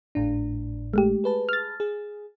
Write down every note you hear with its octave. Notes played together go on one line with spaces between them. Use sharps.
G#1 A2 D4
G#3 A3 G4
G#4 B4 A5
F6 A6
G#4